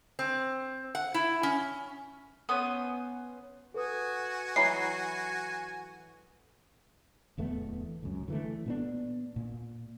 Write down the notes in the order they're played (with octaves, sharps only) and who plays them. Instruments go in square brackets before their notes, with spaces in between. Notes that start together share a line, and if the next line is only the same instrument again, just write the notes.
[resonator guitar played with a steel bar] C4
F#5
E4
C#4
[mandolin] B3 C#4 C5 D#6
[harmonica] F#4 G#5 [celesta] A4 B4 D#6
[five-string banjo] E3 F#3 B5 [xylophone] C7
[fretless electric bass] D1 E2 A3 B3
C#2 F#2
D3 E3 A3
A#2 B3 D4
A#2